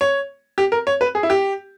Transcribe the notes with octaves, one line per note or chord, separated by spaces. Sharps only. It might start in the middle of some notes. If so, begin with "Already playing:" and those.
C#5
G4
A#4
C#5
B4
G#4
E4
G4